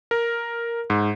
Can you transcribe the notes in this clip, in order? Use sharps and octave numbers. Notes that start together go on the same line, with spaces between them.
A#4
G#2